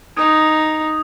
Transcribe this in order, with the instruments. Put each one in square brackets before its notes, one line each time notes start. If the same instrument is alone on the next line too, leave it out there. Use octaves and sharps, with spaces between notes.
[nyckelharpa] D#4 [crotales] D#6 G#6